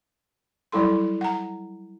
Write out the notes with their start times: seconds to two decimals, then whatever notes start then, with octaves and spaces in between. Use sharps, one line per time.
0.72 F#3 G3 E4 A4 C6
1.21 F#5 A#5